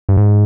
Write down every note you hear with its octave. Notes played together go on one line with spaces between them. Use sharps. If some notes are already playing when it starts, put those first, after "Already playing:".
G2
G#2